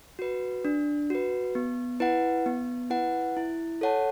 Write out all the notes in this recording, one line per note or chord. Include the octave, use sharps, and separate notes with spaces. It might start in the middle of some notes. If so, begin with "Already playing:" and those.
F#4 B4
D4
F#4 B4
B3
E4 B4 F#5
B3
E4 B4 F#5
E4
A4 C#5 F#5 A5